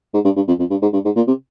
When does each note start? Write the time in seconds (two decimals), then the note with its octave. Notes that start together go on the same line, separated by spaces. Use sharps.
0.14 G#2
0.25 G2
0.36 G2
0.48 F2
0.59 F2
0.70 G2
0.82 G#2
0.93 G2
1.05 G#2
1.16 A#2
1.28 C3